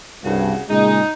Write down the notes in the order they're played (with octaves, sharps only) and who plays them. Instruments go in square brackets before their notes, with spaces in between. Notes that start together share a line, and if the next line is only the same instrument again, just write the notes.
[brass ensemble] C2 G2 [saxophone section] C#3 F#4
[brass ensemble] A#2 C#3 G#3 [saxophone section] D#4